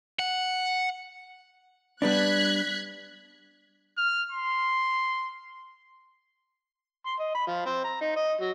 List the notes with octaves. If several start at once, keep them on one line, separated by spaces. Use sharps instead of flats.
F#5
G3 B3 D4 F#6 G#6 B6
F6
C6
C6
D#5
B5
F3
C4
A#5
D#4
D#5
F#3